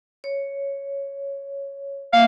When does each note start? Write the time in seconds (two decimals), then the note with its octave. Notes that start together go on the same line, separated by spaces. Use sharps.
0.24 C#5
2.13 A#3 E5 F5